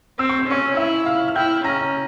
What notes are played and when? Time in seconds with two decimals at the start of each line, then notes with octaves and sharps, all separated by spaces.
0.19 C4 E6
0.29 C#6
0.41 C6
0.48 C#4 C#5 C#6
0.77 E4 E5 E6
1.06 F5 F6
1.28 F6
1.36 E4 G5 G6
1.64 C#4 A#5 A#6